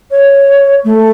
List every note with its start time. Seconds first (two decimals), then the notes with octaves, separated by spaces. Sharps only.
0.11 C#5
0.84 A3